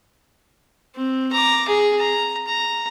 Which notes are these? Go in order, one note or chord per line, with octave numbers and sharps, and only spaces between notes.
C4
A#5 D6
G#4
A#5
A#5